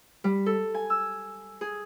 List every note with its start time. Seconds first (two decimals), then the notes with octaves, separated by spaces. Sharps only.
0.24 G3
0.46 A4
0.74 G#5
0.90 E6
1.61 G#4